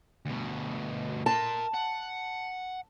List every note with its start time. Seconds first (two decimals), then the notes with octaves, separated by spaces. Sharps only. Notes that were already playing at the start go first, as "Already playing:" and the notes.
0.26 D2 B2
1.26 A#4 A5 C6
1.74 F#5